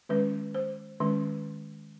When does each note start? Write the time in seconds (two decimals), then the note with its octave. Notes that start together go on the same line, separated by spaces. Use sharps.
0.09 D#3 G#3 C#4 B4
0.54 C5
1.00 D#3 G#3 C#4